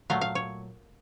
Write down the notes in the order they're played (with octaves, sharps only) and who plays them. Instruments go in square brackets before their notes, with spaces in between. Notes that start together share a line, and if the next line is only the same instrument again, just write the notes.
[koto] A#2 F#3 A3 F5
F5
C#5